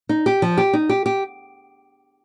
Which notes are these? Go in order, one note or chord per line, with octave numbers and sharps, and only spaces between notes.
D#4
G4
F3
G4
D#4
G4
G4